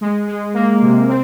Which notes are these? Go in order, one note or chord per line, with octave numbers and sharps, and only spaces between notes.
G#3
G#3
A#3
C3
C4